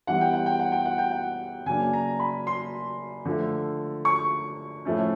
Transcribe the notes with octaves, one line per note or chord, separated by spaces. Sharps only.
E3 G3 B3 F#5
G5
F#5
G5
F#5
G5
F#5
G5
F#5
C#3 F#3 A#3 D4 G#5
A#5
B5
C6
D3 F3 A3
C#6
A2 F3 A3 C#4